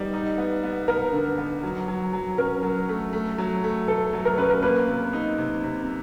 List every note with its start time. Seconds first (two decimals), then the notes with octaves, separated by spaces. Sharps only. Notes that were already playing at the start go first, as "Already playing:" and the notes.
Already playing: G3 B3 D#4
0.14 D#4
0.38 B3
0.64 B3
0.88 B3 A#4
1.13 D3
1.38 B3
1.63 F#3
1.88 F#3
2.13 F#3
2.38 C#4 A#4
2.63 F#3
2.89 A3
3.13 A3
3.38 F#3
3.64 A3
3.88 A3 A4
4.13 F#3
4.25 A#4
4.38 C#4 B4
4.49 A#4
4.63 A#3 B4
4.88 C3
5.13 D#4
5.38 C3
5.64 C3